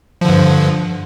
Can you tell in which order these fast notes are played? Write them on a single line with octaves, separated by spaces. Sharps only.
F3 D3 G2